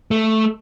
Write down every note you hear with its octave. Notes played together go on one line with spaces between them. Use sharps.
A3